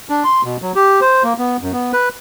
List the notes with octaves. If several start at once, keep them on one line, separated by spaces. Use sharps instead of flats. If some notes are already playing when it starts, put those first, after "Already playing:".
D4
C6
B2
F#3
G4
C5
A#3
B3
F#2
B3
B4